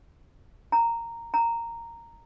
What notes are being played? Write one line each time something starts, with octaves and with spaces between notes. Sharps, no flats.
A#5
A#5